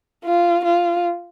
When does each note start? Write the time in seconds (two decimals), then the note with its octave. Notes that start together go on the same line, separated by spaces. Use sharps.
0.25 F4
0.65 F4